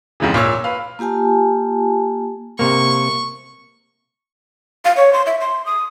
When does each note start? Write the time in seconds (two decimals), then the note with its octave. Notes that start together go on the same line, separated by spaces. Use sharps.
0.20 F2 G#2 C#3 E3
0.34 A#2 C#5 E6
0.64 B4 F5
0.99 A#3 F4 G4 G#5 A5
2.59 C3 A#3 C#6
4.85 F5
4.97 C#5
5.13 C6
5.26 E5
5.40 C6
5.66 D#6